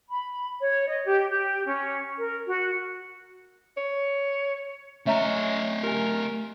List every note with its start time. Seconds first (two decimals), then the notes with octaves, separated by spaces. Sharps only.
0.09 B5
0.60 C#5
0.87 D#5
1.04 G4
1.30 G4
1.66 C#4
2.18 A#4
2.47 F#4
3.77 C#5
5.07 A3 C#4 D#5 E5 A#5
5.83 G4 A#4 G#5